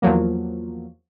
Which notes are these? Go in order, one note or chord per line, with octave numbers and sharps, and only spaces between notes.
E2 F3 F#3 A#3